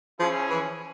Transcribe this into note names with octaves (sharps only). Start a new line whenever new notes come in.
F3 C#4 E4 G#4
E3